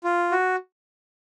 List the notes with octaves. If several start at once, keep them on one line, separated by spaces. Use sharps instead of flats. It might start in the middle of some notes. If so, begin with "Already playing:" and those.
F4
F#4